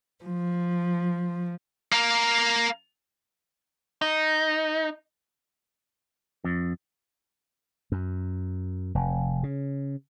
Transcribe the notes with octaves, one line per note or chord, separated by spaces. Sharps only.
F3
A#3 A#4
D#4
F2
F#2
F1
C#3